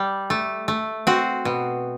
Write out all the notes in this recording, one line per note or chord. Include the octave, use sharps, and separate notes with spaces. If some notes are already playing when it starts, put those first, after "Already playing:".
Already playing: G3
A3
A3
C4 F#4
B2